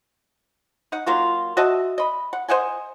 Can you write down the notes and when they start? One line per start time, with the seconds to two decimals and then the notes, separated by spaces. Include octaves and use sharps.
0.92 D#4 F#5
1.06 F#3 A#3 F4 F#4
1.57 F#4 D#5 E5 A5
1.98 D#5 B5
2.33 F#5
2.49 C5 D#5 F#5 G#5